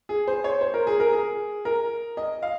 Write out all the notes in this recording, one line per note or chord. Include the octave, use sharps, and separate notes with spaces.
G#4
C5
C#5
C5
A#4
G#4
A#4
G#4
A#4
D#5
F5